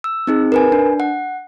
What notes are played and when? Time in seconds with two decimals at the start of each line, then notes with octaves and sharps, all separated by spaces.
0.04 E6
0.27 C4 D#4 G#4
0.52 A#4 B4 G#5
0.72 D4
1.00 F#5